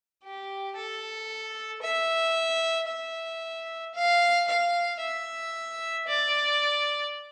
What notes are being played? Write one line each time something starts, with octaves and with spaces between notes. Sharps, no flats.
G4
A4
E5
E5
F5
F5
E5
D5